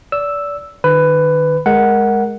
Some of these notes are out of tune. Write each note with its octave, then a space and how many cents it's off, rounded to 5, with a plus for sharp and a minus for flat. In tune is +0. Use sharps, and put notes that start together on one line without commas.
D5 -30 E6 +0
D#3 -40 B4 +15
G#3 +0 A#4 +0 F#5 +0